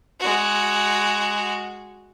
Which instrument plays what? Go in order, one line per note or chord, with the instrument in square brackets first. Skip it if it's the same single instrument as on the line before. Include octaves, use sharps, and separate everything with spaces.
[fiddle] G#3 F#4